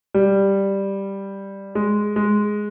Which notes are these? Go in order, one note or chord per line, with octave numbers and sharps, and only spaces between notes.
G3
G#3
G#3